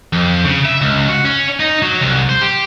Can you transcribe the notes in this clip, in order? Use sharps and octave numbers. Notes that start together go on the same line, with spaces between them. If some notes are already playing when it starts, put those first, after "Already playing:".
F2
C#3
E5
C#2
F#4
C#4
D#4
F#3
C2
C5
G4